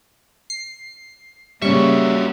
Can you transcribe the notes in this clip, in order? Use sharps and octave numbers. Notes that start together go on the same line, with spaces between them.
C7
C#3 F#3 G3 A#3 C#4 E5 C#6